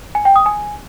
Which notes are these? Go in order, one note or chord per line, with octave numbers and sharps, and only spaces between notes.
G#5
G5
D#6
G#5